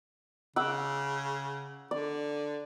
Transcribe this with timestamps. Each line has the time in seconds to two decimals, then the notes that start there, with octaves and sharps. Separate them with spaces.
0.56 C#3 F#5 D6 E6
1.91 D3 D5